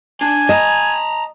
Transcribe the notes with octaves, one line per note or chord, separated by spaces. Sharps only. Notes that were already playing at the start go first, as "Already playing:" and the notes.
D4 G#5
D#5 A5 A#5